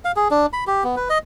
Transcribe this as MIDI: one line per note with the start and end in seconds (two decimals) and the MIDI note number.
0.05 0.12 77
0.16 0.28 68
0.31 0.46 62
0.53 0.64 83
0.67 0.84 67
0.84 0.95 59
0.97 1.09 71
1.10 1.18 75